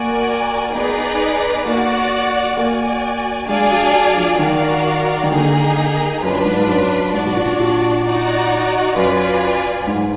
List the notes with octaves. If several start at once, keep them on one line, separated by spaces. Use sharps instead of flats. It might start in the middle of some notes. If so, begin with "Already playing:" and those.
Already playing: A#3 F#4 A#4 D5 G#5
B3 D#4 G#4 B4 D5
A#3 F#4 D5 F#5
A#3 F#4 D5 G#5
G#3 D4 G#4 D5 F5 G#5
F#3
F#3
F3
D#3 F#4 A#4 D5 F5
D#3
D3 A#3 D#4 G#4
F#2 D4 F4 B4
G#2
G#2
F#2
G#2 D4 F#4 D5
B2
A#2
A#2
D#4 F#4 D5
F#2 F4 B4 D5 G#5
G#2